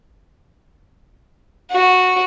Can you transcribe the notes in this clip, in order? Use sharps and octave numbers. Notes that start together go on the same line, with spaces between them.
F#4